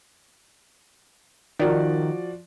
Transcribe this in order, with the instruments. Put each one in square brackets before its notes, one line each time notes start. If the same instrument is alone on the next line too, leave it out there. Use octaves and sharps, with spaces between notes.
[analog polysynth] D#3 [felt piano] F3 F#4 D5